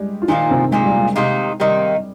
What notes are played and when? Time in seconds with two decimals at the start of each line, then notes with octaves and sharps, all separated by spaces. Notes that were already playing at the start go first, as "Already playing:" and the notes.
Already playing: G3 G#3 G4
0.22 F4
0.28 A#2 D#3 F3 A#3 D#4
0.51 C3 C4
0.72 A#2 F3 G#3 A#3
0.85 G3
0.97 G#3
1.16 C3 D#3 A#3 D#4
1.60 C3 D#3 G3 A#3 D#4